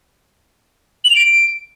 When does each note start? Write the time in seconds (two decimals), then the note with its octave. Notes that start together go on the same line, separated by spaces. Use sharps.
1.05 F#7
1.10 F7
1.16 D7